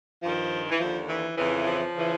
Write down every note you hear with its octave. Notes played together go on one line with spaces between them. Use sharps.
G2 D#3 F3
E3
D#2 D3 F3
E3
F2 C#3 E3
F3
C#3 E3